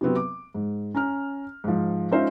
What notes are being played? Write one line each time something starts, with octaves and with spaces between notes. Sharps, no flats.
C3 F#3 B3 C4
D6
G#2
C#4 A#5 F6
G#2 F3
G#3 C#4 D#4 F4 C5 E5